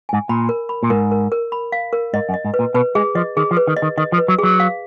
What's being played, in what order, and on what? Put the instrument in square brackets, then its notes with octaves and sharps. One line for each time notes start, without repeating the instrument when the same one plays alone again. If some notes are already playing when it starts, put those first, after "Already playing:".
[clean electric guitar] G#2 [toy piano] G#5
[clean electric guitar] A#2 [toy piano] B5
[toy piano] A#4
B5
[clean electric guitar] A#2
[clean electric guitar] G#2 [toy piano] A#4
[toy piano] A#4
A#4
B5
F5
A#4
[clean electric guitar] G#2 [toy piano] D#5
[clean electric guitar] F#2
[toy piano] D#5
[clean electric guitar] G#2
[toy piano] B4
[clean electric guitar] A#2
[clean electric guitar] B2 [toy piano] B4
[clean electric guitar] G#3 [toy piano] G#4
[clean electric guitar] F3 [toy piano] D#5
[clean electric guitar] D#3 [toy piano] G#4
[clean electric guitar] F3
[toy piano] B4
[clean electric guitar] D#3
[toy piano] D#5
[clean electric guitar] D#3
[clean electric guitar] D#3 [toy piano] D#5
[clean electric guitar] F3
[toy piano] B4
[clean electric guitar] F#3
[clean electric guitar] F#3 [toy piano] G#4
[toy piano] F5